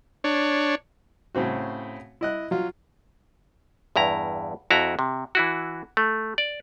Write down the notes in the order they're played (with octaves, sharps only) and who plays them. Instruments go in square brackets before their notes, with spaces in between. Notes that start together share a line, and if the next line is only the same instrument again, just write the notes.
[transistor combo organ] D4 C#5
[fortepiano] A2 C#3 C4 F#4
E4 D#5 F#6
F#3 F4
[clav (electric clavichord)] E2 G2 E4 A#5
F2 E4 F#4 A#5
C3
E3 E4 F#4
A3
D5